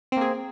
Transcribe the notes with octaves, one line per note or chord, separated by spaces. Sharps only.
A#3 C4 G#4